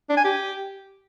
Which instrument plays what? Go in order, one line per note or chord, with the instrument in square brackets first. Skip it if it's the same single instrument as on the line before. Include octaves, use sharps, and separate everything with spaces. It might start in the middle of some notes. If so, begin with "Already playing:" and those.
[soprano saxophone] D4
G#5
G4